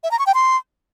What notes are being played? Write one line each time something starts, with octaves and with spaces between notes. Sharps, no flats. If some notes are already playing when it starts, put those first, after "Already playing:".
E5
A#5
C#6
G5
C6